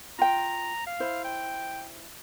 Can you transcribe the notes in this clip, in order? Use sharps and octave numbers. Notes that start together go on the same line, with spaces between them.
F4 G5 A#5
F5
E4 C5
G5